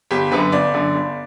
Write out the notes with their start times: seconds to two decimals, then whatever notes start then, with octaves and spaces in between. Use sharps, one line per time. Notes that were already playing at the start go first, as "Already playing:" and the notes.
0.11 G1 G4
0.31 F#2 D3 B4
0.52 G1 D5
0.74 F#2 D3
0.94 G1